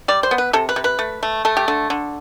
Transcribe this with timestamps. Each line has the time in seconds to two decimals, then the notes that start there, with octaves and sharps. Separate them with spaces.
0.08 G3 D5
0.23 C5
0.31 B3
0.38 B4
0.53 C3 A4
0.69 B4
0.76 C3
0.84 B4
0.99 A3
1.23 A3
1.45 A3 A4
1.57 G4
1.68 D3 A4
1.90 D3